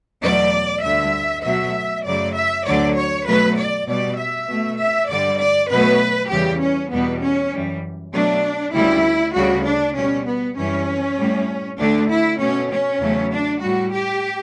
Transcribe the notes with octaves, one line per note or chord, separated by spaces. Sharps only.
E2 B2 F#3 A3 D5
D2 D3 G3 E5
B2 F#3 A3 E5
F#2 C#3 F#3 A3 D5
E5
D2 D3 F#3 D5
C#5
B2 F#3 A3 B4
D5
B2 G3 D5
E5
B2 A3
E5
G2 D3 G3 D5
D5
B2 F#3 A3 B4
E2 C#3 E3 G3 G4
C#4
E2 B2 G3 B3
C#4
F#2 E3 G3
B2 F#3 A3 D4
D2 C#3 G3 E4
D2 C#3 G3 F#4
D4
B2 G3 C#4
B3
F#2 E3 G3 C#4
A2 G3
D2 D3 A3 D4
E4
B2 A3 C#4
C#4
E2 C#3 F#3 A3
D4
A2 G3 F#4
G4